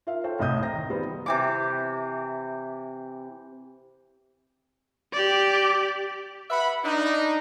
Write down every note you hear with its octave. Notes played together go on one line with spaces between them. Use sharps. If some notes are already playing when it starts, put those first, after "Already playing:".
F4 A#4 E5 F5
A4 C5 C#5 G5
C2 A2 D#5 D#6 G6
C5 G5 A#5 A#6
D#3
G3 B3 C5
C3 E3 D6
G4 D5
B4 E5 F#5 B5
D4 D#4